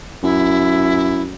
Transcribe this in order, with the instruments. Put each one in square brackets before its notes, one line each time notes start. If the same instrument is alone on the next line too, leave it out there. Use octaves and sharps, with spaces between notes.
[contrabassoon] F#2 [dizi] E4